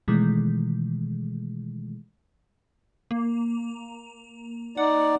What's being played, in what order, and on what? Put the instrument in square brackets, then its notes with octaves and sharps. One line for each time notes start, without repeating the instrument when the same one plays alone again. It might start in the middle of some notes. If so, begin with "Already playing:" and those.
[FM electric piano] B2 D#3 E3 G#3 A3
[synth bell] A#3
[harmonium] D#4 D5 [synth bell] F#5